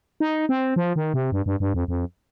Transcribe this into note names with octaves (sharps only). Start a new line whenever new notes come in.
D#4
C4
F3
D#3
C3
G2
G2
G2
F2
F2